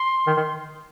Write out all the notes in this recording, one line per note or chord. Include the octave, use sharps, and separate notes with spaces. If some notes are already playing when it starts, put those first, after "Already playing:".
Already playing: C6
D#3
D#3